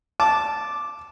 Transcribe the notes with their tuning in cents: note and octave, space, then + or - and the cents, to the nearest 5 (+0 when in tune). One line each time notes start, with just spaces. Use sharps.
A5 -10 D6 +0